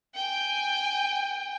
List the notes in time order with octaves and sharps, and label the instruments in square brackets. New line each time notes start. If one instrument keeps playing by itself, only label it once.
[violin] G5 G#5